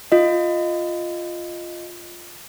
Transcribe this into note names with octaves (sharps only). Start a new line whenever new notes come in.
F4 D#5